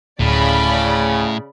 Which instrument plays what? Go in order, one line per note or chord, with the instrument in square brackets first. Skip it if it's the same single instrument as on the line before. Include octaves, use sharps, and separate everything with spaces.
[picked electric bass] D1 [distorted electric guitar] A2 [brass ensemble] C#3 [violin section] D5 B5